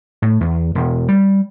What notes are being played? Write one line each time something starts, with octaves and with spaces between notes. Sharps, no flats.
A2
E2
E1
G3